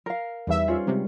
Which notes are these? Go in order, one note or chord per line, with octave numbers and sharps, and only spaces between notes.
A#4 F5
E2 G3 D#4 B4 E5
C#4 F4 G#4 C5
C3 G3 G#3